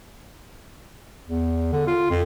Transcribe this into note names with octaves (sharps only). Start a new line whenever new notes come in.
E2
D3
F4
F2